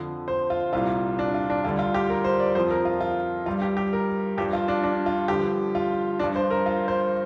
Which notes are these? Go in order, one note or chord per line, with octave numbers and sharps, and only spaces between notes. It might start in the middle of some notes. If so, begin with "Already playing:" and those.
Already playing: F2 D3 F3
C5
F4
C2 A#2 G3 F4
D4
F4
D4
D2 D3 G3 F4
F4
G4
A#4
C5
D5
F2 F3 C5
A#4
F4
F4
G2 G3 F4
G4
G4
A#4
G2 F3 G4
F4
D4
D4
F4
G2 D3 F3 G4
F4
G2 F3 D4
C5
A#4
F4
C5